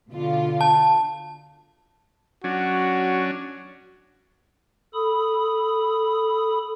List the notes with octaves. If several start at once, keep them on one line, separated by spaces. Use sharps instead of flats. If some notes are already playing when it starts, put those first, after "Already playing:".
B2 D3 F4
A5
F#3 C#4 D4 F#4
A4 B5 D#6